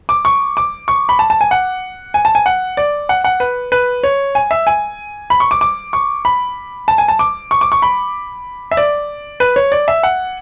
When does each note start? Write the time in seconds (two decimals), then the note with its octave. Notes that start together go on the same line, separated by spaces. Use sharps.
0.09 D6
0.25 C#6
0.57 D6
0.88 C#6
1.09 B5
1.19 A5
1.30 A5
1.41 G#5
1.51 F#5
2.14 G#5
2.25 A5
2.35 G#5
2.46 F#5
2.77 D5
3.09 F#5
3.24 F#5
3.40 B4
3.72 B4
4.03 C#5
4.35 G#5
4.51 E5
4.67 G#5
5.30 B5
5.40 C#6
5.51 D6
5.61 D6
5.93 C#6
6.25 B5
6.88 A5
6.98 G#5
7.08 A5
7.19 D6
7.51 C#6
7.61 D6
7.72 C#6
7.82 B5
8.71 E5
8.77 D5
9.40 B4
9.56 C#5
9.72 D5
9.88 E5
10.03 F#5